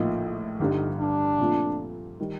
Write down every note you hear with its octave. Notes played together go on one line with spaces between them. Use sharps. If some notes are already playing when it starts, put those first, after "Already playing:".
Already playing: A#1 A2 F3 A#3 D#4 F4
G1 G2 D3 G3 D4 D#4
D4
A#2 F3 A3 C4 F4
D#3 G3